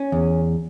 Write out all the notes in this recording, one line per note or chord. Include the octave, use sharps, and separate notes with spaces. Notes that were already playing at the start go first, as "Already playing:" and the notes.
Already playing: C#4
E2